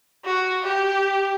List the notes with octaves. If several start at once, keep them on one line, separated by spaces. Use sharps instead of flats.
F#4
G4